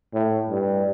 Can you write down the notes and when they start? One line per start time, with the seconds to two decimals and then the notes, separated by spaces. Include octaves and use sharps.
0.14 A2
0.50 G2